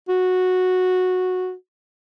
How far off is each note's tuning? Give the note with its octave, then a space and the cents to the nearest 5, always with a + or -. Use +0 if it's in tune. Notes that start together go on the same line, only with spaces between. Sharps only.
F#4 -10